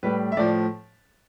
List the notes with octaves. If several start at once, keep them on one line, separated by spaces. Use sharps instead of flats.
A2 G3 B4
E5
A2 F3 D5